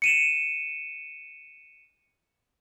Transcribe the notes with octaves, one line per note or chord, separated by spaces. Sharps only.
C#7 D#7 E7